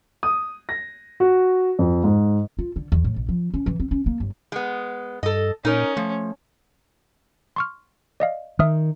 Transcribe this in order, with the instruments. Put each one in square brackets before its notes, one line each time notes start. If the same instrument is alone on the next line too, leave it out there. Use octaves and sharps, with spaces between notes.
[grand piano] D#6
A#6
F#4
F2
G#2
[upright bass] F4
D3
E2
A2
A#1
F3
C#4
E3
C4
C#4
A#3
G1
[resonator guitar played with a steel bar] G#3 B3
[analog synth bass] G2 [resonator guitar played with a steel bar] A4 D#5
[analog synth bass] A#2 [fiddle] C#4 [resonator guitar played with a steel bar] D#4 A#4
[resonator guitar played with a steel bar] F3 [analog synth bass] A3
[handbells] C6 C#6 F6
D5 D#5 F5
[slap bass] D#3 [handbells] E5 D#6 F6